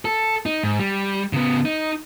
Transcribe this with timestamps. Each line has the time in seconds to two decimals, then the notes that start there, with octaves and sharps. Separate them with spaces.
0.05 A4
0.46 D#4
0.63 G#2
0.79 G3
1.33 C#3 B3
1.65 D#4